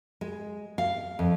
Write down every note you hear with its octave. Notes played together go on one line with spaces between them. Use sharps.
G#3
F5
F2